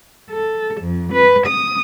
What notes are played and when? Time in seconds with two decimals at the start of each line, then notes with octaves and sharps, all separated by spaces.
0.30 A4
0.80 F2
1.12 B4
1.47 D#6